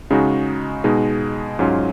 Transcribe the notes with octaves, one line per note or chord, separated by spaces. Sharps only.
C#3 G#3 D#4 F#4
B2 G#3 D#4
G#2 F#3 C#4 F4